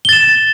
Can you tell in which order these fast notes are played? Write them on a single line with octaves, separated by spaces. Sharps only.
G7 A6 E7